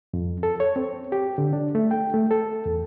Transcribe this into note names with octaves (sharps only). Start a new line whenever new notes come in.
F2
A4
C#5
C4
G4
D3
D4
A3
G5
A3
A4
E2